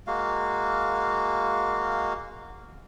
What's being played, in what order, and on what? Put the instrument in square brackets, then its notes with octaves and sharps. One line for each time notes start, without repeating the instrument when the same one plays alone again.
[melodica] G#3 A#3 F#4 F5